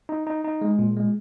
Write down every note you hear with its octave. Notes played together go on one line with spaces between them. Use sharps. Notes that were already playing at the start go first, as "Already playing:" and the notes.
D#4
D#4
D#4
G#3
A#2
G#3